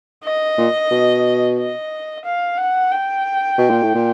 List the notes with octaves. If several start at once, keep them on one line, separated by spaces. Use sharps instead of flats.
D#5
A#2
B2
D#5
F5
F#5
G5
B2
A#2
A2
A#2